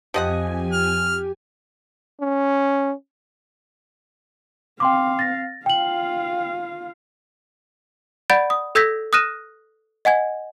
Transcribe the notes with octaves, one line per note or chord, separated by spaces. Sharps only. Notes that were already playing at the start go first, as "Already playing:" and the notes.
F2 F3 G4 D#5 F#5 G#5
F6
C#4
C4 F5 G5 C6 D6
A6 A#6
F4 F5 G5 F#7
D5 F#5 B5 G6 A6 D7
D#6
A4 E6 G6 G#6 A#6 B6
D#6 F6 F#6 A#6 D#7 E7
D#5 F#5 G#5 G#6